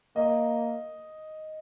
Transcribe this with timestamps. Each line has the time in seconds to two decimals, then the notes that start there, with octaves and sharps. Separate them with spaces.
0.16 A#3 D#5